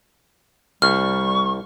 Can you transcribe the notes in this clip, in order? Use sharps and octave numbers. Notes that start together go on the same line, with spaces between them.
C2 G3 C#6 F6